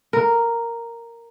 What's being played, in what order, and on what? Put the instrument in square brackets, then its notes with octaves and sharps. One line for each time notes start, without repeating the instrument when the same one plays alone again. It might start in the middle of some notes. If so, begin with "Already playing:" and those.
[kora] A#4